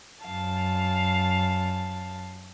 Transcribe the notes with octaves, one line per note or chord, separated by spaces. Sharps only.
F#2 F5 A5